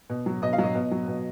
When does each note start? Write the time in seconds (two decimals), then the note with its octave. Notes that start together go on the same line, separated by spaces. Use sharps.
0.10 B2
0.26 F#3
0.42 B2 D#5
0.53 F5
0.58 F#3
0.63 D#5
0.75 B2
0.91 F#3
1.08 B2